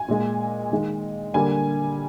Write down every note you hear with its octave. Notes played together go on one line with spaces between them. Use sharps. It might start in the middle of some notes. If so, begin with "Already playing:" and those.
Already playing: G#5
A#2 G#3
D#3 G#3
D3 G3 A#3 G#5